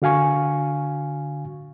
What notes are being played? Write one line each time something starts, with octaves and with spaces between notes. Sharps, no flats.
D3 F#4 F5 G#5 C#6